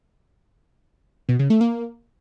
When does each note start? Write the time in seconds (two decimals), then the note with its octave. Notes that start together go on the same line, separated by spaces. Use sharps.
1.29 B2
1.39 C#3
1.50 A3
1.61 A#3